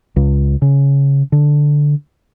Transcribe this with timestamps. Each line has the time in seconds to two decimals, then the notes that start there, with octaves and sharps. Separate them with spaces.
0.16 C#2
0.62 C#3
1.32 D3